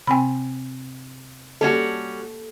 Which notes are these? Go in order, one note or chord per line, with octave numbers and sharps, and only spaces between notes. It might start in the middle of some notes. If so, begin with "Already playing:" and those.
C3 C4 G5 G#5 B5
G3 A#3 C#4 F#4 G4 A4